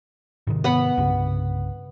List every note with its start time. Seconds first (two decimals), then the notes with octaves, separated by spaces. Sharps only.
0.47 G#2 C3 D#3
0.64 B3 F#5 B5
0.97 C2 G2 C#3